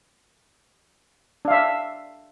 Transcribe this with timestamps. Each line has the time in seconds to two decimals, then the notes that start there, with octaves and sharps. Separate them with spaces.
1.45 D4
1.48 F5
1.51 E5